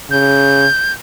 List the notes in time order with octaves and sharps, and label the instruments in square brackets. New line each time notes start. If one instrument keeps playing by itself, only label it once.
[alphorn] C#3 [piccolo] G6